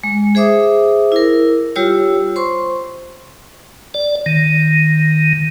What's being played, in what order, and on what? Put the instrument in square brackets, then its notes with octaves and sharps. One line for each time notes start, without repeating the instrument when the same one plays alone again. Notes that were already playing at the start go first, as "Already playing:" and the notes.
[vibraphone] G#3
G#4 C5 E5 D6 D#6
E4 A#4
G3 F4 G4 C#5 E6
C5 C6 C#6
[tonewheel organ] D5
D#3